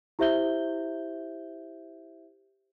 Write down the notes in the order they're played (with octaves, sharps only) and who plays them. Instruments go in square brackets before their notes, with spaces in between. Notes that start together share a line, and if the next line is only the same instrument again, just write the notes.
[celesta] E4 G4 C5 E5 G6 G7